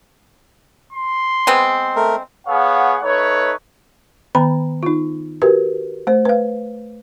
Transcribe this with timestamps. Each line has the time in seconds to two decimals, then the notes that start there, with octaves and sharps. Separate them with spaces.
0.93 C6
1.47 G#3 B3 C4
1.96 A3 A#4
2.48 B3 G#4 C#5 F5 F#5
3.03 A3 D#4 B4 C#5
4.35 D#3 B3 A#5 B5
4.83 D#4 F4
5.42 F#4 G4 A#4 B4
6.07 A3 C5
6.25 B4 F5